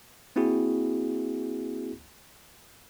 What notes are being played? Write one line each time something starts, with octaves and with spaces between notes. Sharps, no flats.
A#3 C4 E4 F#4 G#4